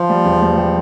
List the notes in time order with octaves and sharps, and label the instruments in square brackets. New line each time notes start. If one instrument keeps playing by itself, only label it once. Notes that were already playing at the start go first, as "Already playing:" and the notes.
Already playing: [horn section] F3
[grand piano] G3
E1
G3
G3